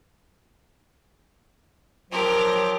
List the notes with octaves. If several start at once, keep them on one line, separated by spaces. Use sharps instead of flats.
F3 F#3 G4 A#4